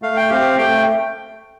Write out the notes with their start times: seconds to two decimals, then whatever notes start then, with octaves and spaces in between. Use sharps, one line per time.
0.02 A3 F5
0.17 G5
0.30 C4 G4 F5
0.58 A3 G5